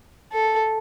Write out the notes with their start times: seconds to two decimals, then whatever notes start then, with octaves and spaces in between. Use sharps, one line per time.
0.32 A4